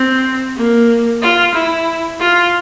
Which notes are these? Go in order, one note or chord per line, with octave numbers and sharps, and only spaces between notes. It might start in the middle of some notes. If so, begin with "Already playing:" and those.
Already playing: C4
A#3
F4
E4
F4